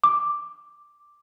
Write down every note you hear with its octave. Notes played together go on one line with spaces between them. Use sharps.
D6